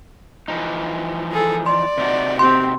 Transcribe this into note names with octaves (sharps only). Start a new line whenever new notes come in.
E3 F3 D#4
G#4 A4
D5 C6
C3 D#4 F#4
C4 G4 C6